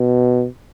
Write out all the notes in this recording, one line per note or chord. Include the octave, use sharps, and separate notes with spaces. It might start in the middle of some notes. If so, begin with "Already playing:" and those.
Already playing: B2